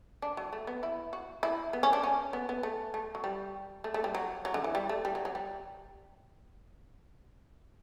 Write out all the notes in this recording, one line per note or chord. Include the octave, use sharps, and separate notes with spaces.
D4
F#3
A3
B3
E4
F#4
E4
B3
C#4
D4
C#4
B3
B3
A3
A3
F#3
G3
A3
A3
G3
F#3
F#3
D3
E3
G3
A3
G3
F#3
F#3
G3